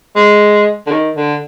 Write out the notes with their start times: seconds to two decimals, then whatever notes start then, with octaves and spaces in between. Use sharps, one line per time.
0.16 G#3
0.87 D3
0.91 D#3
1.16 D3